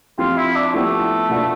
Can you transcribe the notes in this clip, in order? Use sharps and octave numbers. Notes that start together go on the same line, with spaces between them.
F3 C4 F4 G4
E4
D4
F3 A3 B3 E4 G4
B2 B3 D4 F4